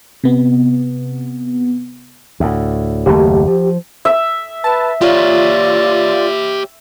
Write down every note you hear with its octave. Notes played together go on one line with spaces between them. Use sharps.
C3 B3
D2 A2
F#1 D#2 A3 G4
F3
E5
B4 A5
F4 G4 C#5 D5